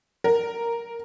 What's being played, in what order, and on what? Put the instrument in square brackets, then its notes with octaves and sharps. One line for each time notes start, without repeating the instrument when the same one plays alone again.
[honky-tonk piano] A#4